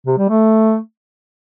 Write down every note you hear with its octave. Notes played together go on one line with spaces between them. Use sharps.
C3
G3
A3